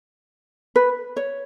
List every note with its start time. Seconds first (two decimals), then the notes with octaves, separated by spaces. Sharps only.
0.76 B4
1.17 C#5